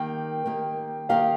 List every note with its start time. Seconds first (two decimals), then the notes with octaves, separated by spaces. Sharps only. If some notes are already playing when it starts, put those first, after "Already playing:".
Already playing: D#3 A#3 G4 A#4 G5
0.46 D#3 A#3 G4 A#4
1.09 D#3 A#3 G4 A#4 F5